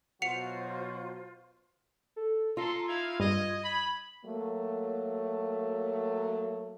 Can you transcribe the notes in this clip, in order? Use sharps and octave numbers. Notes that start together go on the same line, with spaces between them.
B2 F#3 F4 F#4 C5 F#5 C#7 F7
A4
F4 A4 A#5 C6
D#4 E4 F5 G#6
G2 D#5
B5
F#3 A3 A#3